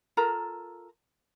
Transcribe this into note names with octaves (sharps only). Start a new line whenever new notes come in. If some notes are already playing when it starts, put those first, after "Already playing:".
F4 A4 A#4 A#5